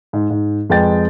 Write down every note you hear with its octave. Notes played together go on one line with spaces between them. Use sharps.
G#2
G#2
F2 G#3 B4 G5 A6